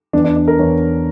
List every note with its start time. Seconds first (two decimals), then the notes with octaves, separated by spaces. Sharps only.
0.13 E2 E3 D4
0.24 D4
0.37 D4
0.48 A#4
0.59 E2 E3 C#5